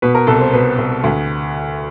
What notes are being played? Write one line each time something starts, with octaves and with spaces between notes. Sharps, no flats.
B2 B4
A#4
C2 A4
C5
B2 B4
C2
D2